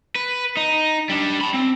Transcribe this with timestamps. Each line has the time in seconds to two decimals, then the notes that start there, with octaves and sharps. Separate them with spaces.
0.16 B4
0.57 D#4
1.09 G3 D4
1.41 A5 B5
1.54 C4